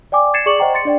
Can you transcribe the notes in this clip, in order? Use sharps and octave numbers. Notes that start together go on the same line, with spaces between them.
D5 G5 G#5 D6
G#6 A6 C7 C#7 E7
G#4 D5 C#6 D6 C#7 F#7
C5 D#5 F#5 G5 A#5
C6 A6 C#7
D4 D5 G5